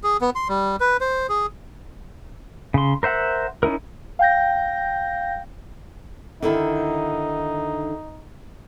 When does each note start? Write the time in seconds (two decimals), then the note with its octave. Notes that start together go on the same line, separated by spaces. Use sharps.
0.04 G#4
0.21 B3
0.35 C6
0.48 G3
0.80 B4
1.01 C5
1.29 G#4
2.74 C#3 C6
3.03 A#4 C5 E5 F#5
3.63 C#4 D#4 E4 A#4
4.19 F5 G5 G6 A#6
6.42 D3 D#3 D#4 E4